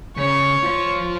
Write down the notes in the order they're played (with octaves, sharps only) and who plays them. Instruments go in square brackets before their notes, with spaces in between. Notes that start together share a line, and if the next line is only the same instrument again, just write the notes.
[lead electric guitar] C#3 [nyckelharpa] C#5
[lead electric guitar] F4 C5